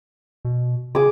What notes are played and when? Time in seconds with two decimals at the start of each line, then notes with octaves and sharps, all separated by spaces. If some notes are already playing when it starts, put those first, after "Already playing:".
0.45 B2
0.95 C#3 G#4 D6